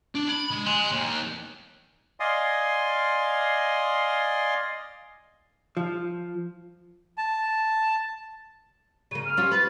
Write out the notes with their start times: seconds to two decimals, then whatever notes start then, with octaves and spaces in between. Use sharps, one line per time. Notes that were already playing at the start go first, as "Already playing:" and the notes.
0.15 D4
0.29 B5
0.51 G#3
0.67 G#5 C6
0.91 D#2
2.20 D5 D#5 F5 G#5 C6 D#6
5.77 F3
7.18 A5
9.11 C#3 A#3 D#7
9.25 F6
9.37 C#4 F4 G4
9.51 B4 A6